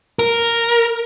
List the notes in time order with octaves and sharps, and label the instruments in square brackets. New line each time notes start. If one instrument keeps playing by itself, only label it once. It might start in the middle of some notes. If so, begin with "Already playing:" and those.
[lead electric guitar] A#4